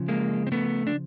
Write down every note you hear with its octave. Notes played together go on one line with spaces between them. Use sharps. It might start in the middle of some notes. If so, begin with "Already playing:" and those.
Already playing: C#3 F3
G#3 A#3
C4
A3 B3
D4